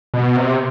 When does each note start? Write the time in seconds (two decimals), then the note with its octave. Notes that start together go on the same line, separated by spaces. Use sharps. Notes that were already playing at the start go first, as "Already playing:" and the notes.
0.14 B2
0.36 C3